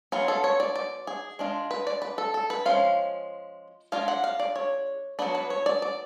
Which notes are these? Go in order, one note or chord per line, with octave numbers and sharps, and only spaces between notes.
F#3 B3 F4 G#4
A4
C#5
D5
D5
G#4
G#3 D4 F4
B4
D5
B4
A4
A4
B4
F3 G#3 C#4 F4 F5
G#3 D4 F4 F5
F#5
F5
D5
C#5
F#3 B3 D4 B4
B4
C#5
D5
D5